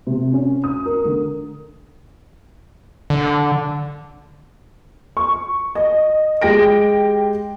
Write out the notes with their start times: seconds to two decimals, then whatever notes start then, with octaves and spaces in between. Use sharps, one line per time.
0.07 C3
0.33 C#4
0.64 D#6
0.86 A#4
1.05 D3
3.10 D3
5.17 C#6
5.75 D#5
6.42 G#3 G4 G5 A#6 D7